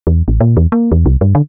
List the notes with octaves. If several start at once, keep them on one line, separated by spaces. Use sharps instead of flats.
E2
A1
A#2
E2
A#3
E2
C2
G2
D3